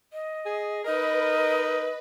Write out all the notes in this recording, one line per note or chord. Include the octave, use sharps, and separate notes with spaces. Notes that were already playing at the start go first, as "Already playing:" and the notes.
D#5
G#4
D#4 A#4 B4 D#5